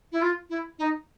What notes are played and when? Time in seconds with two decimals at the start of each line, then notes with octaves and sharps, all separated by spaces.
0.12 E4
0.22 F4
0.50 E4
0.79 D#4